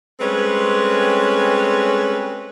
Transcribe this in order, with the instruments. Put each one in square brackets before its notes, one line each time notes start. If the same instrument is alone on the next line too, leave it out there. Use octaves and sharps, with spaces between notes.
[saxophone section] G3 G#3 C4 C#4 A4 B4